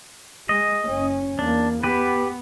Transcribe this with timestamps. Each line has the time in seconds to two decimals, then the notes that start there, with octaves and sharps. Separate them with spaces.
0.49 G#3 D#5
0.85 F#1 C#4
1.39 E2 A#3 D4
1.83 B3 G4 B4